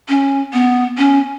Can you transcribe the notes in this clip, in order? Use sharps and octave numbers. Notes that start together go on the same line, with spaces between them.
C#4
B3
C#4